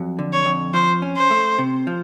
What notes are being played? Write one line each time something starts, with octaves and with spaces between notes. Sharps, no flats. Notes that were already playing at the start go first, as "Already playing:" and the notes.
Already playing: F2 F#3
D3
C#5
F2
F3 C5
C#4
C5
A3
C3
F3